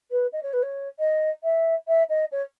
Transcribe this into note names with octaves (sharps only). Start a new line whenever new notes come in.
B4
D#5
C#5
B4
C#5
D#5
E5
E5
D#5
C#5